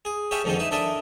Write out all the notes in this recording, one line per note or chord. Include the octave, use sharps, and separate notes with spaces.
G#4
G4 G#4 C#5 E5 F5 A5
F2 G#2 D3 D#3 G#3 C4
D#4 E4 B4 E5
D4 E4 A4 A#4 D#5 E5